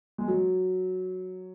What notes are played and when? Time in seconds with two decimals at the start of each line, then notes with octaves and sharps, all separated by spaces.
0.18 G#3
0.28 F#3